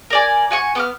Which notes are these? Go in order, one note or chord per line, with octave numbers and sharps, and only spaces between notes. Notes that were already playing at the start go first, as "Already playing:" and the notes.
A#4 D5 G#5
F#4 G#5 C#6
B3 D6 F6